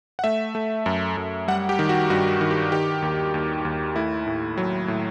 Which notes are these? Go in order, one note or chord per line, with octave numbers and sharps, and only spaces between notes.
F#5
A3 E5
A3
F#2
F#2
G3 F#5
G4
D#3
F#4
G2 F#4
D#3
G4
D#3 G4
D#2
D#2
D#2
A3 E4
A2
F#3
A2